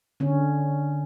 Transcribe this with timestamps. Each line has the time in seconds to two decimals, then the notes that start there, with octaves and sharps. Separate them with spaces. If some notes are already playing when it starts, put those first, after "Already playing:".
0.20 D3 C#4